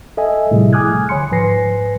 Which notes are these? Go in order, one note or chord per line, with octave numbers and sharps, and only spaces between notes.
A4 D#5 E5 G#5
A2 C3 F3 G3 E4 G#4
G#5 D6 D#6 F6 F#6 G#6
D3 C#5 G#5 B5 C6 C#7
G#2 F3 B4 G#5 A#6 C7